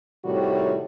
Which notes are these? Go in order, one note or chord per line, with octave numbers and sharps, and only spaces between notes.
A2 C3 D#3 G3 F#4 C#5